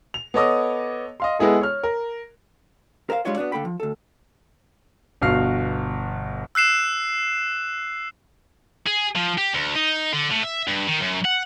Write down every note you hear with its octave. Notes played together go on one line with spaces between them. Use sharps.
F7
B3 A4 C#5 D#5 D6 D#6
D#5 F5 C6
G#3 B3 E4 G#4 A4
C#5 F6
A#4
A#4 C5 E5 F5
G3 G#3 D4 F4 C#5 D#5
B3 D4 F#4 D5
D3 A#3 A4 G5 B5
F3
D2 A4
G1 B2 F#4 F5 F6 C7
E6 F#6 C7 E7
G#4
F3
G4
D2
D#4
D3
A2
E5
G2
D#3
F#2
F#5